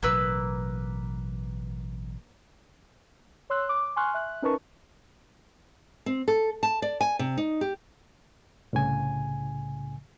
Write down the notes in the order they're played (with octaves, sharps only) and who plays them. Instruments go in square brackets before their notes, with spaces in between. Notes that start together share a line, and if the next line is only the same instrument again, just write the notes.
[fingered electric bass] A1 B2 F#3 [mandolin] A#3 B4 E6
[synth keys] C#5 C6 E6 F#6
D6
G#5 C6 C#6 F6 F#6
E5 F#6
C#4 D#4 A#4 B4 A5 C#6
[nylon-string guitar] C4
A4
A5
D5
G#5
C3
D#4
G4
[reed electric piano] C2 A2 C#3 G#5